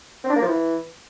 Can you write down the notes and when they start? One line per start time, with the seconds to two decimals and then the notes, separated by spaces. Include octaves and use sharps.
0.24 C4
0.30 D4
0.36 A#3
0.42 F3
0.48 E3